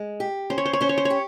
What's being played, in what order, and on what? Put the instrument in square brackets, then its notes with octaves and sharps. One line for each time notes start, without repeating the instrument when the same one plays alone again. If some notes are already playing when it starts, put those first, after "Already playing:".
Already playing: [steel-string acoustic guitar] G#3
G4
[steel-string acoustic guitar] C#4 [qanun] C5
[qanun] C#5
C5
C#5
[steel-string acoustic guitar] C#4 [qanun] C5
[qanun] C#5
C5
C#5
[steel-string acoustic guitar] G4